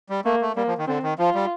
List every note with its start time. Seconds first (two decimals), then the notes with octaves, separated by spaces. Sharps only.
0.10 G3
0.25 A3 A#3
0.41 A3
0.56 G3 A#3
0.67 F3
0.78 D#3
0.87 D3 C4
1.03 D#3
1.19 F3 F4
1.35 G3